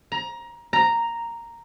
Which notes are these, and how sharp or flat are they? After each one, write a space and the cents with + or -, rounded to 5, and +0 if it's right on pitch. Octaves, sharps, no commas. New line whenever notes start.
A#5 +20
A#5 -5